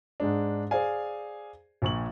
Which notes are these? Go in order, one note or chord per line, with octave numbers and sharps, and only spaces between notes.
G#2 G#3 D4
G#4 C5 D5 F5 G#5
A#1 A#2 C#6 F#7